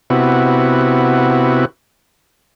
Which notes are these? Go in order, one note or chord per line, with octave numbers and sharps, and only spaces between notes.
C3 B3 E4 F#4